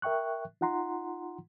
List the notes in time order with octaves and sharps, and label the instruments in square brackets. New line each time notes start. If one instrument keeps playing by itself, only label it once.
[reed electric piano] A#4 E5 G5 C#6 F#6
D#4 F4 F#5 A#5 C6